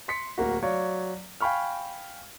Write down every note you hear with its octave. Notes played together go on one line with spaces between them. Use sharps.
C6 B6 C#7
D1 A#3 F#4
F#3 C#5 D5 F5
F5 G5 G#5 B5 C#6 F6